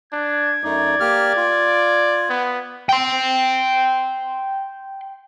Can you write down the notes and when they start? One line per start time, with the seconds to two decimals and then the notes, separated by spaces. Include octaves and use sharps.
0.12 D4 G#6
0.64 F#2 A3 D#4 D5
1.00 A#3 G4 F6
1.37 F4
2.29 B3
2.89 G5 C6